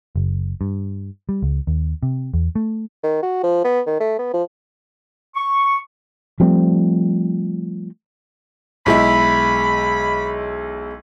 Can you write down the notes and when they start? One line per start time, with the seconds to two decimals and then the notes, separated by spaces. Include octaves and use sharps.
0.16 F#1
0.61 G2
1.29 G3
1.42 C#2
1.67 D#2
2.03 C3
2.34 E2
2.55 A3
3.03 D#3
3.23 F#4
3.43 F3
3.64 B3
3.87 D#3
4.00 A3
4.19 B3
4.34 F3
5.35 C#6
6.40 F3 G3 A3 C4
8.86 B1 G#3 E4 B5